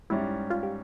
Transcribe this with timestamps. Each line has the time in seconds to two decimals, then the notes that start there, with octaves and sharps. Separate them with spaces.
0.10 G#2 G3 C#4 E4
0.50 F4
0.63 G4